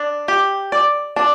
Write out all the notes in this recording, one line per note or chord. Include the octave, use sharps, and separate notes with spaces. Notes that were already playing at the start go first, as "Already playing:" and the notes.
Already playing: D4
G4
D5
D4